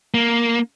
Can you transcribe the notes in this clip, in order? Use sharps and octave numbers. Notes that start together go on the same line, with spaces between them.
A#3